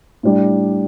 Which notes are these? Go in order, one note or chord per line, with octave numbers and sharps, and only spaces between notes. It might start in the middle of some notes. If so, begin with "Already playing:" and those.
A2 G3 D4